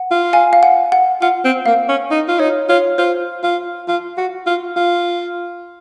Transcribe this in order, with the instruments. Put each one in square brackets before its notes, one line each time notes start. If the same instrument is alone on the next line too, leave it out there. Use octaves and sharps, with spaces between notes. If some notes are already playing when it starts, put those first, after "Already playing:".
Already playing: [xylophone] F#5
[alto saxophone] F4
[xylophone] F5 G#5
F5
F#5
F#5
[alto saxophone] F4 [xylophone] F#5
[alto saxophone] C4
[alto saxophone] A#3 [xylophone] F5
[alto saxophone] C#4
D#4
F4
[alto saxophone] D#4 [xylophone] C#5
[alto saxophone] F4 [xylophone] C#5
[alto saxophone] F4 [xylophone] C5
[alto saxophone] F4
F4
F#4
F4
F4